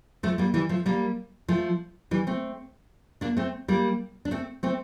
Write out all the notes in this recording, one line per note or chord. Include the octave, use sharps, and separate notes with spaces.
F3 A3
G3 A#3
E3 G3
F3 A3
G3 A#3
F3 A3
E3 G3
A3 C4
A#3 D4
A3 C4
G3 A#3
D4
A3 C4
A3 C4